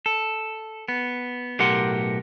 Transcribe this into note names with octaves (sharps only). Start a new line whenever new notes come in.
A4
B3
B1 A2 G4 A#4 F#5 C6